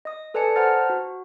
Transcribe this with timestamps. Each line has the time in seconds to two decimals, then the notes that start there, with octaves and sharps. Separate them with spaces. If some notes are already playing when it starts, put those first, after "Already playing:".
0.05 D#5 D#6
0.34 A4 B4 D5 G#5 A5 C#7
0.56 C5 F#5 A5 A#5 F6 A6
0.90 F#4